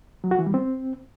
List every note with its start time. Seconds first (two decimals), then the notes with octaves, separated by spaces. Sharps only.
0.24 F#3
0.31 F#4
0.39 E3
0.46 G3
0.54 C4